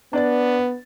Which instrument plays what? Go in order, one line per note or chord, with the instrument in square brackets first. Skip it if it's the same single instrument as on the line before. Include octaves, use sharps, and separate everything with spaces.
[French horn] B3 [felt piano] D4 D5 A6